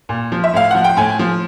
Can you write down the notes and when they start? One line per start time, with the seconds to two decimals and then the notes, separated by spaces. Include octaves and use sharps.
0.09 A#2
0.32 F3
0.44 E5
0.53 A2 F5
0.71 F3 F#5
0.84 G5
0.97 A2 G#5
1.19 F3